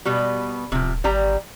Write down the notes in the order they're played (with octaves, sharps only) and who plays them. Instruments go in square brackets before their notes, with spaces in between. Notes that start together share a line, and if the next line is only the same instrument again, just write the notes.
[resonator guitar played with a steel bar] B2 G3 B3
[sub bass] D1 [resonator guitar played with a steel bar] C3 F3
[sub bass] G#1 [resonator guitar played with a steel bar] G3 G4 A#5